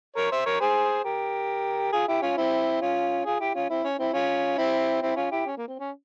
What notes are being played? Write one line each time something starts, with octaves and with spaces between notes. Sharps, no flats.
A#4 C#5
C5 E5
A#4 C#5
G#4 C5
G4 A#4
F4 G#4
E4 G4
C#4 F4
C4 E4
C#4 F4
F4 G#4
E4 G4
C#4 F4
C4 E4
C#4
C4 E4
C#4 F4
C4 E4
C4 E4
C#4 F4
E4 G4
C#4
A#3
C4
C#4